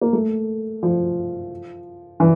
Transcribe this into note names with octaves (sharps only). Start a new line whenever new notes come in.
A#3
A3
F3
E3